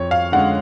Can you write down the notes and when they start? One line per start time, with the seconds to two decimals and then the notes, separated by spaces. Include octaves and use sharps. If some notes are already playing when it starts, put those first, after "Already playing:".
Already playing: F2 C#5
0.11 F5
0.32 D3 G#3 C#4 F#5